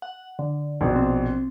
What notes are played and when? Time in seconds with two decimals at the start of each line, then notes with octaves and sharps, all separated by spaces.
0.02 F#5
0.39 D3
0.81 A#1 B2
0.96 C4